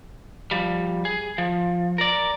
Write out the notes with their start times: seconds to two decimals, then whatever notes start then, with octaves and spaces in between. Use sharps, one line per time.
0.51 F3 G3
1.05 G#4
1.38 F3
1.98 A#4 D5